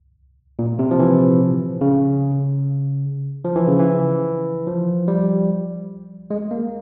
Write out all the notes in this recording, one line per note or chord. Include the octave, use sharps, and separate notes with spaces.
A#2
C3
F3
E3
C#3
F3
E3
C#3
E3
F3
G3
G#3
A#3